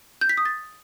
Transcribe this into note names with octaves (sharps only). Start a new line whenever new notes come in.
G6
B6
D#6
A6